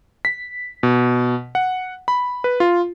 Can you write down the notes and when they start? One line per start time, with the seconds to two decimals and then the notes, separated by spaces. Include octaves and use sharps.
0.25 B6
0.83 B2
1.55 F#5
2.08 B5
2.44 B4
2.60 F4